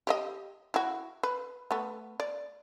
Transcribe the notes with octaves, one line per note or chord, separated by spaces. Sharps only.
G4 D5 D#5
E4 F#4
B4
A3 B3
D5